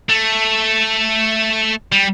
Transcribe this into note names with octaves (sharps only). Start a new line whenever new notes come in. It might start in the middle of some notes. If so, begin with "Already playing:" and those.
A3
G3